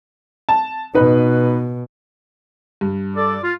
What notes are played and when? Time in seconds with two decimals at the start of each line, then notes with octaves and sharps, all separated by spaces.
0.49 A5
0.95 B2 D#4 B4
2.81 G2
3.16 A4 D5
3.43 F4